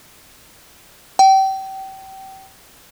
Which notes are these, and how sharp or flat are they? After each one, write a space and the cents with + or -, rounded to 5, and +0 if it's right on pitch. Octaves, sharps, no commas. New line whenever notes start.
G5 -30